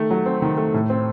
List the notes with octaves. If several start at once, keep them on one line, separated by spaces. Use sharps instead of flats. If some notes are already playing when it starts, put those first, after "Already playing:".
Already playing: D#3 A3
F#3
C4
D#3
A3
A2
C4